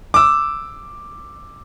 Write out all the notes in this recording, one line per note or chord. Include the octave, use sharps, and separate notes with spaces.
D6 E6